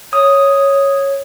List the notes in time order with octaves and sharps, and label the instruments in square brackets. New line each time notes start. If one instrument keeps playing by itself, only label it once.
[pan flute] C#5 [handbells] D#6